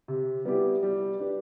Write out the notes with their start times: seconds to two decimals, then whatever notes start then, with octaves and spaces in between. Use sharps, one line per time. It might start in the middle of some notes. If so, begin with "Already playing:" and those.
0.08 C3
0.45 G3 B3 E4 G4
0.83 G3
1.19 D4 G4 B4